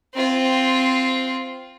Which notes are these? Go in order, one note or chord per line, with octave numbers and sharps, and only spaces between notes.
C4 F4